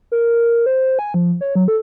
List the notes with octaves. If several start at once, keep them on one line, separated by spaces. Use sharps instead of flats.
A#4
C5
G#5
F3
C#5
F#3
A4